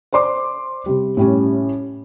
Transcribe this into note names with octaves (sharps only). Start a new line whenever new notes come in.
C5 D5 C6 D6
C3 G3
A2 G3 C#4